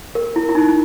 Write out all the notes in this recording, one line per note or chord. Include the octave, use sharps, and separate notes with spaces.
A#4
E4
E4
D#4